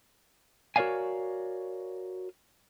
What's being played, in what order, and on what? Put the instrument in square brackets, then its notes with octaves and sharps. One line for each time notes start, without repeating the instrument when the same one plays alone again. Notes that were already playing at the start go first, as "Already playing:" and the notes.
[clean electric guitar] F#4 A#4 C#5 D5 F5 G#5